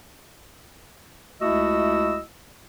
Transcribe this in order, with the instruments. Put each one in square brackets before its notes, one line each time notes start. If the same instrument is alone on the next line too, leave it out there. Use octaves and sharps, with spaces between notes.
[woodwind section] C#2 A3 E4 F#4 D#5 E6